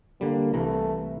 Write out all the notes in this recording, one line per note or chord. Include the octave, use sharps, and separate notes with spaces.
D3 G3 A#3
C2 E3 A3 A#5